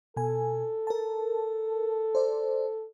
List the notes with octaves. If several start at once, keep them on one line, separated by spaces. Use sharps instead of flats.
B2 A4 G#5
A#4 A5
C5 D5